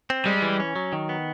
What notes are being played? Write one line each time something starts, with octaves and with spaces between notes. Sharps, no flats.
C4
G3 G#3
E3
C#4
F#3
D#3
B3